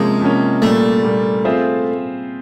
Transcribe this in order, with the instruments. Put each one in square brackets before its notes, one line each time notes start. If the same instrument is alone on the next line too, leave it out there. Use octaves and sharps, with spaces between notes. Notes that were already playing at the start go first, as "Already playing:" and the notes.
Already playing: [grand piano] C3 F3 A#3 C#4 [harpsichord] G#3
[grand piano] C3 F3 A#3 C#4
[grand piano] A#2 G3 A#3 [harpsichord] A3
[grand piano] A#2 G3 A#3
C4 F4 G#4 C5 E5